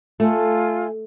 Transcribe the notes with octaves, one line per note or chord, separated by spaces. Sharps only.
A3 F4 A4 G#5